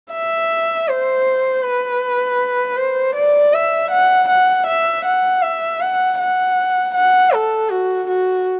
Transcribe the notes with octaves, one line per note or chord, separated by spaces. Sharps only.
E5
C5
B4
C5
D5
E5
F#5
F#5
E5
F#5
E5
F#5
F#5
F#5
A4
F#4
F#4